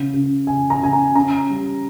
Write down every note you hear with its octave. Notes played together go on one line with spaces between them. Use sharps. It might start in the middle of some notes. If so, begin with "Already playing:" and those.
Already playing: C#3
C#3
C#3 G#5
A#5
C#3 G#5
A#5
C#4 A#5
G3